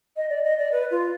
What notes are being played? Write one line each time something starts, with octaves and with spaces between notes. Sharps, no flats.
D#5
D5
D#5
D5
B4
F4